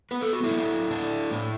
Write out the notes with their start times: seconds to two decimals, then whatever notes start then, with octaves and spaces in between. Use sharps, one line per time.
0.11 B3 B4
0.21 A4
0.33 F#4
0.44 E4 A4
0.51 F#3
0.91 D4
1.31 A2